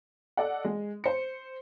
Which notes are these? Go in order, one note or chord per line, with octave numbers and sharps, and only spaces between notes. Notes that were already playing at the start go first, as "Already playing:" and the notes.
A4 D5 D#5 F#5
G#3
C5 C#7